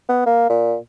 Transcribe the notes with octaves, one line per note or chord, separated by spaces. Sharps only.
B3
A#3
A#2